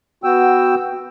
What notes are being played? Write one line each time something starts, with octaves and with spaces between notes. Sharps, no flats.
B3 F#4 G5 E6